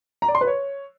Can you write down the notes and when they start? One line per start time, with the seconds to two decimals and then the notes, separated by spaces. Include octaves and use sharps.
0.22 A#5
0.28 D5
0.35 C6
0.41 B4
0.47 C#5